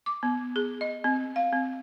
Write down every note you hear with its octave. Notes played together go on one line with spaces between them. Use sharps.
D6
B3
G#4
D#5
C4
F5
C4